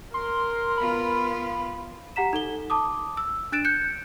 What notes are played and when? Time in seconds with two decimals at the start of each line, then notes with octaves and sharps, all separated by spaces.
0.14 A#4 C6
0.78 B3 F4 B5
2.16 G4 F#5 A#5 B6 E7
2.33 D#4 A4 G7
2.70 A5 D6 D#6
3.17 E6
3.52 D4 F#6 A6 D7 E7
3.64 F#6 G6 C#7